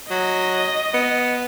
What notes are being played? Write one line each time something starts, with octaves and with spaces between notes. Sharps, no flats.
F#3 D#5
B3